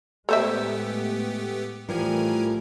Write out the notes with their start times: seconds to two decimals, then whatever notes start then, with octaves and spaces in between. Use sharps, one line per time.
0.29 A2 G#3 A3 B3 G4 A4 C5 E5
1.89 A2 E3 F3 G3 A3 A#4 G#5